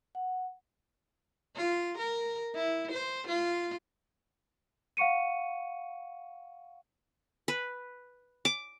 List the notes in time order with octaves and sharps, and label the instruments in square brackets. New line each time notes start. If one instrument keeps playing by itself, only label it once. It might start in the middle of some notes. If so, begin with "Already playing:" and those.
[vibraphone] F#5
[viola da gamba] F4
A#4
E4
C5
F4
[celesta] F5 F#5 C#6 C#7 D#7
[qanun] B4
D6